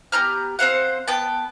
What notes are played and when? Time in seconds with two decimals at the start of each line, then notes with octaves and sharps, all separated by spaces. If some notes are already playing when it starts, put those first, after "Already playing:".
0.12 B3 G4 A#5 F6
0.59 C4 C5 F5 F#5
1.07 B3 G5 A5